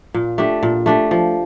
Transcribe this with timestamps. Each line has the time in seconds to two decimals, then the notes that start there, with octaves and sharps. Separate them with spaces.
0.14 A#2
0.38 A3 D4 G4
0.63 A#2
0.86 A3 D4 G4
1.11 F3